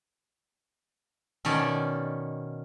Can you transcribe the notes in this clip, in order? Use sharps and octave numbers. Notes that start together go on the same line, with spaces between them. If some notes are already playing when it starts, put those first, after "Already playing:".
B2 D#3 C#4 D5